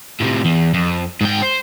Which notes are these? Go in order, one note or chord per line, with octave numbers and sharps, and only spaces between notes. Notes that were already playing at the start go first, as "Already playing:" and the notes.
A2 C3
E2
F2
G#2 G5
C5